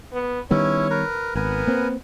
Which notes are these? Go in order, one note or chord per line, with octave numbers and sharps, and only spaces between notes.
B3
D#3 G3 B3 C#4 E4 C#5
A#4 B4
G#1 B3 A#4 B4 G#5
A#3 C4